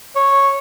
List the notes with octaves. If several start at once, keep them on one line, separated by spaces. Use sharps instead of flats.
C#5